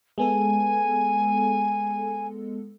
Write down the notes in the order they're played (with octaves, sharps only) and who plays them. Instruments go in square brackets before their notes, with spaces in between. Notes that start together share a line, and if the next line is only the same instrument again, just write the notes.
[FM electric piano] G#3 B3 A4 [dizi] G#5